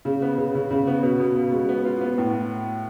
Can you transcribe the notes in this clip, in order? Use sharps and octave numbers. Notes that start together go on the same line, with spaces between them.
C#3
B3
C#3
C#3
C#3
B3
B2
B2
B2
G#3
B3
F4
B3
A2